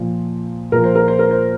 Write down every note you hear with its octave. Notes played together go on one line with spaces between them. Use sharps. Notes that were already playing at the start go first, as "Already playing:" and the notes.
Already playing: A#2 F3
A#2 F3 A#4
C5
A#4
C5
A#4
C5